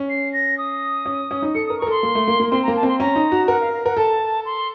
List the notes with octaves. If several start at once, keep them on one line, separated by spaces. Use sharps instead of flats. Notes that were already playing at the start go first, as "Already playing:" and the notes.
Already playing: C#4
C7
A#6
D#6
C#4
C#4
D#4
A4 C#7
A#4 D#6
A#4 C#6
A4 C6
A#3
A3
A#3
A#3
C4 C6
A#3 A#5
A5
C4 C6
C#4 A#5
D#4
F#4
A#4 F#5
F5
F5
A#4 F#5
A4 A5
C6